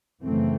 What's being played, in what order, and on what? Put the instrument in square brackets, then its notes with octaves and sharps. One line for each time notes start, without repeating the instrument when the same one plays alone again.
[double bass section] F#2 C#3 E3 A3 C4